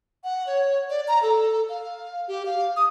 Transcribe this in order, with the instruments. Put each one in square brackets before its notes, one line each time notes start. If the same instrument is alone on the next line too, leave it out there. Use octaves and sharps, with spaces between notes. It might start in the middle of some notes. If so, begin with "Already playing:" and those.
[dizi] F#5
C#5
D5
A#5
A4
F5
G4
F5
D#6